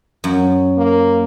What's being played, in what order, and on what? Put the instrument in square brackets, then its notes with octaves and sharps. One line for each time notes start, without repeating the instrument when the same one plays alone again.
[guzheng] F#2
[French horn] A#3